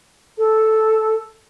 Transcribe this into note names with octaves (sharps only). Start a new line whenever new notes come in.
A4